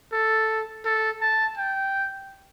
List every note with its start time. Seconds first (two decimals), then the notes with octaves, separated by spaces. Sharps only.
0.12 A4
0.85 A4
1.21 A5
1.57 G5